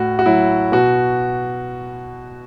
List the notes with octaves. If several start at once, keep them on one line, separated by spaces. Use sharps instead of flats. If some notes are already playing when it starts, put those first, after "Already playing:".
Already playing: A2 F#4
F#4
F#3 E4
B2 F#4